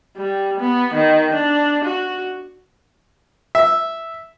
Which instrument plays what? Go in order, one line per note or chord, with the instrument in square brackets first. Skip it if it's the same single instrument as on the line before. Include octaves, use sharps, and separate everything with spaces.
[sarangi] G3
B3
D#3
D4
F#4
[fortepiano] E5